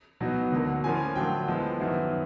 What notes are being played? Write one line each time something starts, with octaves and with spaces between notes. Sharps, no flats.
B2 F#3 B3 D#4
D2 D3 F#3 A#3
A2 F3 A#3 C#4 F4 G#5
D3 F#3 A3 D4 F4 G5
A2 F3 G#3 B3
F#2 D#3 F#3 B3 E4